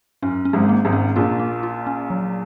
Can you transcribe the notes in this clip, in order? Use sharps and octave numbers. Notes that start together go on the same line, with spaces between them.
F#2 C#4
C#4
G#1 G#2
A#3
G#1 G#2
C#4
A#1 A#2 F4
A#3
F4
C#4
F#3